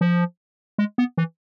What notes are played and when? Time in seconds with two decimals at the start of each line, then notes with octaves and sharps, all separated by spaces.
0.01 F3
0.78 G#3
0.98 B3
1.18 E3